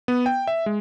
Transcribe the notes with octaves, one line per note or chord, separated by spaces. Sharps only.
B3
G5
E5
G#3